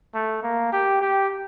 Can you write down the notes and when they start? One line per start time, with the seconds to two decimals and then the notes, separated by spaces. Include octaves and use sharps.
0.14 A3
0.43 A#3
0.72 G4
1.01 G4